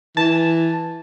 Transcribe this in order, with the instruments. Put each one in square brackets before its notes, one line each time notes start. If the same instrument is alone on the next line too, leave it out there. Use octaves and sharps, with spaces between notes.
[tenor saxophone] E3 [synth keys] A5